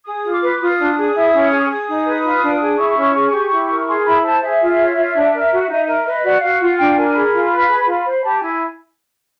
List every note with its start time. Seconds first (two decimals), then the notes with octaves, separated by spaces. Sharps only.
0.06 G#4 D#6
0.25 F4
0.33 D6
0.42 B4
0.60 F4 D#6
0.79 D4
0.97 G#4
1.15 E4
1.34 C#4
1.51 G#4
1.70 G#4 D#6
1.88 D#4
2.06 B4
2.24 F4
2.42 D4
2.60 G#4
2.78 E4 C#6
2.96 C#4
3.14 G#4
3.32 G4
3.51 E4
3.70 A#4
3.87 G#4 C6
4.05 E4 B5
4.23 C5 A5
4.42 G#4 E5
4.60 F4
4.79 C#5
4.96 F4
5.15 D4
5.33 A#4
5.51 F#4
5.69 D#4
5.88 A#4
6.06 B4 D#5
6.24 F#4 D5
6.41 F#4 F5
6.60 F4 F#5
6.78 D4 G5
6.97 A#4 G#5
7.14 G#4 B5
7.33 F4
7.51 B4
7.69 G#4
7.87 F4
8.06 C5
8.24 G4 A5
8.41 E4 G#5